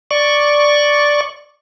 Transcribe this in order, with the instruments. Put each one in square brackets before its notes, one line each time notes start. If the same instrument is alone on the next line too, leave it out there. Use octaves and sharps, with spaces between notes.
[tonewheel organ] D5 C#6